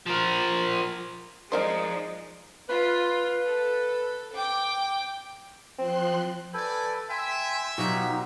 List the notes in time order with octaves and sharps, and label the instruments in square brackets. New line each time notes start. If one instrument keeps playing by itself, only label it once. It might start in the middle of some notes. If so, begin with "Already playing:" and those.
[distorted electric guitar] F3 A#4
[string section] F3 G#3 [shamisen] C4 A#4 C5 [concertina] D#4 [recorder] D5
[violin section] F4 [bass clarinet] B4
[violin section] A4
G5 D6
[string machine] F3 C6 F#6 [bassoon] C4
[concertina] A4 B4 [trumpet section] D5 G5 G#5
[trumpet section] E5 [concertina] G5 G#5 [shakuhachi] C6
[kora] B2 F#3 [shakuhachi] D#4 [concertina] F4 G4